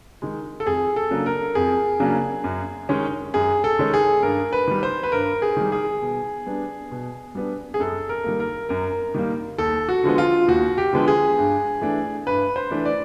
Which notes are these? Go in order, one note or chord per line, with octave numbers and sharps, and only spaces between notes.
D#3 G#3
A4
F2 G#4
A4
C#3 F#3 A#3 D4
A#4
F2 G#4
C#3 F#3 A#3 D4
F#2
D#3 G#3 C#4
F#2 G#4
A4
D#3 G#3 C#4
G#4
G2 A#4
B4
D#3 G3
C5
B4
G2 A#4
G#4
D#3 G3
G#4
B2
G3 B3 D4
B2
G3 B3 D4
G#4
F#2 A4
A#4
D#3 G3 A#3
A#4
F#2 A#4
D#3 G3 A#3
D#2 A4
F#4
D3 F3 G#3 B3
F4
D#2 F#4
G4
D3 F3 G#3 B3
G#4
G2
E3 A3 D4
G2 B4
C5
E3 A3 D4
D5